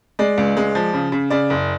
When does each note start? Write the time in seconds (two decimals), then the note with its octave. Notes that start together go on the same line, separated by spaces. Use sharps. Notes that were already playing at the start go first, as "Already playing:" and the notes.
0.19 G#3 D5
0.38 C#2
0.57 G#3
0.75 F3
0.94 C#3
1.12 C#3
1.30 C#3 D5
1.50 F#1